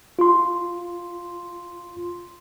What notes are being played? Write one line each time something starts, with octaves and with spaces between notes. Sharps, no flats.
F4 C6